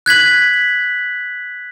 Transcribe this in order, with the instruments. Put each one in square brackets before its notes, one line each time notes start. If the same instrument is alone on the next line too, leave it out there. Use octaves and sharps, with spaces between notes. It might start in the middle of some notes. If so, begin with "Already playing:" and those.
[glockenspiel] F#6 G#6 B6 F#7